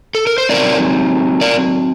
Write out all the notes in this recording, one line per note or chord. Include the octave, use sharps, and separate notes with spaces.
A4
A#4
C5
F#3 C4 D#4 A#4 D5
A#4 D5